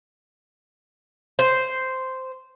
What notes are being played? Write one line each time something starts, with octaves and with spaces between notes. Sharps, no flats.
C5